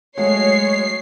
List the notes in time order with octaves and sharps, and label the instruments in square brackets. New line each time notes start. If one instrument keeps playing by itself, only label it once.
[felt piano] F#3 A3 F#4 [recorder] G#3 [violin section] C#5 [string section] C7